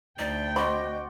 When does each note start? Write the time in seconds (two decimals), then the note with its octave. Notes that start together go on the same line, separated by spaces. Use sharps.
0.19 D2 D#4 D5 G5
0.56 C4 F#4 D5 D#5 B5